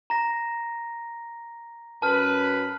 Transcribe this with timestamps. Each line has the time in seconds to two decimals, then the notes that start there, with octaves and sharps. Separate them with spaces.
0.10 A#5 A#6
2.02 F#2 B4 A5 F6